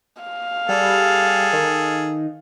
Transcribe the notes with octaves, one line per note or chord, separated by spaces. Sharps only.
F5
G3 G#4 A4
D#3